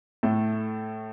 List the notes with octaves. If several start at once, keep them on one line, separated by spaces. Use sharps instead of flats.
A2 A3